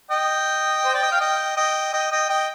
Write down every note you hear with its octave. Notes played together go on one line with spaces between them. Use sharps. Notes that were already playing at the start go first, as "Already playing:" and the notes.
D#5 G5
C5
D5
D#5
F5
D#5 G5
D#5 G5
D#5 G5
D#5 G5
D#5 G5